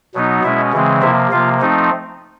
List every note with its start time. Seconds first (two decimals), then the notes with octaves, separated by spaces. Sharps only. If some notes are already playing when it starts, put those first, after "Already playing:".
0.14 B2 F#3 B3 D#4
0.43 B2 G#3 C#4 E4 E5
0.73 C#3 E3 G#3 C4
1.02 C3 F3 A#3 E4 E5
1.31 C3 F3 A#3 F4 F5
1.61 F3 A3 C4 D#4